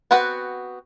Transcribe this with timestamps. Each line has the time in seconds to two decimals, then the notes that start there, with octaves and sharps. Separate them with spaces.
0.11 B3 C4 F#4 B4 F#5